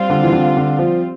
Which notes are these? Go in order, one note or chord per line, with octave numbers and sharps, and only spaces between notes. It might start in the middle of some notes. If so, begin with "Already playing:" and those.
Already playing: G3 C4 F4
D3
E3
D3
D3
F3